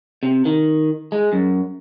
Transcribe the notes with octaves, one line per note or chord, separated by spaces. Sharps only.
C3
D#3
G#3
F#2